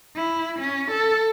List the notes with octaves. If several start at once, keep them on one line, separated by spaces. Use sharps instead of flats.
E4
C#4
A4